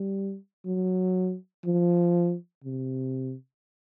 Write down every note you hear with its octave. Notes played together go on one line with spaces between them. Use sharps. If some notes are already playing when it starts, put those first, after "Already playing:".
Already playing: G3
F#3
F3
C3